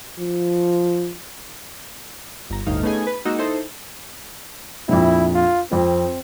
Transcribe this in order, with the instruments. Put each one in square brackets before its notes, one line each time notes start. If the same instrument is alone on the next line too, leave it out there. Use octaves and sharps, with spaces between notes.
[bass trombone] F3
[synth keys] G1 A#5
G1 D2 A2 D#4 F5
A3 B3 C#4 D#4 G#4 G#5
B4
G#3 A#3 D#4 F#4 E6
D#4 E4 A4 C5
[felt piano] A#1 F2 [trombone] E4
[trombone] F4
[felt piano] F2 C5 [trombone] C4